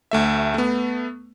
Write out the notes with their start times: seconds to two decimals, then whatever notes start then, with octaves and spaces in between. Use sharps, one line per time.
0.11 D2 A3 E5
0.54 A3 B3